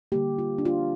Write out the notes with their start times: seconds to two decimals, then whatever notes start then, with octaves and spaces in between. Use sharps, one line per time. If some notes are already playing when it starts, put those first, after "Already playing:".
0.12 D3 G3 A#3 G4
0.39 F4
0.58 D4
0.65 F4